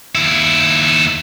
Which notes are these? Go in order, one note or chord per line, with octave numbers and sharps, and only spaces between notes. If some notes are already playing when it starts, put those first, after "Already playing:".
D#2 E4